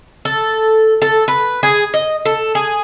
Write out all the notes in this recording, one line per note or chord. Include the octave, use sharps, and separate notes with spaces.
A4
A4
B4
G#4
D#5
A4
G#4